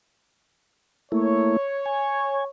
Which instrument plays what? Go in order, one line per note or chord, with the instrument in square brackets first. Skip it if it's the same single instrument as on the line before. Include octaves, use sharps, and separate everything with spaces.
[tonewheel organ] A3 A#3 E4 [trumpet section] C#5
[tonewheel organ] G#5